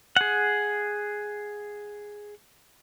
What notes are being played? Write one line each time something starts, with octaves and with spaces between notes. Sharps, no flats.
G#4 F#5